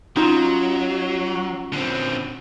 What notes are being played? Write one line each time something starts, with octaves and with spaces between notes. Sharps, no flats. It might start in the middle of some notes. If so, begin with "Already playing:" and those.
F#3 C#4 D#4 F4 C6
D3 C4